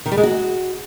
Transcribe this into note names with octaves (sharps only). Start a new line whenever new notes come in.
D#3
G3
G#3
F#4